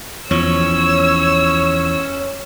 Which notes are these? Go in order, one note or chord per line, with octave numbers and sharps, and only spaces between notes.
E2 F3 C#4 C#5 E6